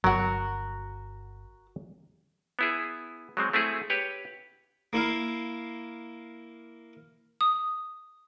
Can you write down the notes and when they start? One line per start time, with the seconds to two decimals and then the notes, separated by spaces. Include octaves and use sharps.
0.04 G1 F#3 F#4 A#4
2.59 B3 E4 G#4
3.37 F#3 G#3 C4
3.53 A3 C4 E4 F#4 G#4
3.90 G4 B4 C#5
4.93 A#3 E4 F5
7.41 D#6